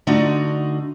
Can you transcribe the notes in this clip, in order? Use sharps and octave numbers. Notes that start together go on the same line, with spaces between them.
D3 A3 D4 D#4 F4 F#4